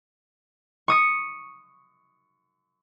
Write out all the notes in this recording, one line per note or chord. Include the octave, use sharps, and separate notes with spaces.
C#6 D#6 C#7